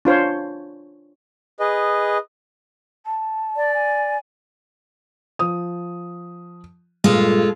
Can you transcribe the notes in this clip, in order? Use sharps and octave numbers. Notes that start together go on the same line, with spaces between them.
D4 F4 C5 C#5
G#4 B4 D#5
A5
D5
G#5
F3 D#6
G2 A#2 G#3 F4 A4